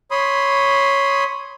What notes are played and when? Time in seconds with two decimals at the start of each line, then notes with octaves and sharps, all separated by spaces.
0.11 C#5 B5 C6 D#6